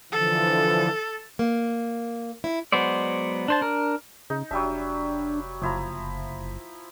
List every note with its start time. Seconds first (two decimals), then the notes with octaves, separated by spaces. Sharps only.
0.12 D3 E3 F3 A4
1.39 A#3
2.44 E4
2.72 F#3 G#3 B3 C5 D5
3.48 D4 C5 A5
3.61 D4 A#4
4.30 C#3 D#4
4.51 F1 F#3 G3 D4 E5
5.62 F#1 F3 E4 A#5